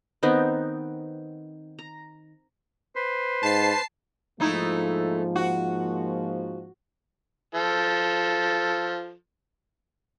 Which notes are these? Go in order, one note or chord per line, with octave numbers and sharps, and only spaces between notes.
D#3 B3 C4 D#4
A#5
B4 C5
G#2 A5 C7
G#2 F3 A3 A#3 D#4 E4
F#4
F3 A4